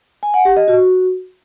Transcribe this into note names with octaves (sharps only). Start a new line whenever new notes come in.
G#5
F#5
G4
D#5
F#4